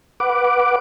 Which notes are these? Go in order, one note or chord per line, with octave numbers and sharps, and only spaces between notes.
B4 F#5 D6